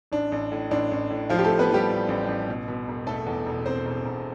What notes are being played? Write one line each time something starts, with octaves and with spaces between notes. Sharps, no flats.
A1 D4
A1
A2
A1 D4
A1
A2
A2 F3 F4
G4
A3 A4
A2
B3 B4
F3 G3 G4
A2
A1
A1
B2
B2
E1
B2 A3 A4
E2
E1
E1 C4 C5
E1
E1